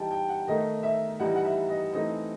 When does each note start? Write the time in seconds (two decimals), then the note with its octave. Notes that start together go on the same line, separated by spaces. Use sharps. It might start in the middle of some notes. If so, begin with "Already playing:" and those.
Already playing: E3 G3 D#4 G5 A5
0.11 G5
0.29 F#5
0.47 D#3 A3 D#4 D#5
0.83 E5
1.19 E3 G3 D#4 F#5
1.36 F#5
1.45 E5
1.69 D#5
1.93 E3 A3 C4 D#4 D#5